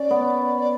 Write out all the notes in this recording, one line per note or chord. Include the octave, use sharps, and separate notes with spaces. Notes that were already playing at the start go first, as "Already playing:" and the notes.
Already playing: C#4 D5
B3
D5